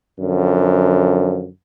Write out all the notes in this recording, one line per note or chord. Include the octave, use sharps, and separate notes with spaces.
F#2 D3 F3